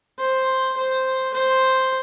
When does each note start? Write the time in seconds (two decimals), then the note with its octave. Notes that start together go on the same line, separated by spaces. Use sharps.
0.19 C5
0.77 C5
1.34 C5